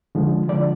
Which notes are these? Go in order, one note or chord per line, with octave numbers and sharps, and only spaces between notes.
D3 F3 G#3
D3 F3 G#3 D5